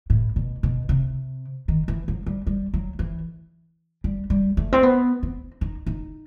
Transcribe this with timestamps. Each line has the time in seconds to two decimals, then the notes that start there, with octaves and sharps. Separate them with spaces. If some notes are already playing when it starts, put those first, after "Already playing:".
0.10 A2
0.36 B2
0.63 B2
0.89 C3
1.68 D#3
1.88 E3
2.08 F#3
2.26 G3
2.47 G3
2.74 F#3
2.99 E3
4.04 G3
4.30 G3
4.57 A3
4.73 C4
4.83 B3
5.23 C4
5.61 D#4
5.87 D#4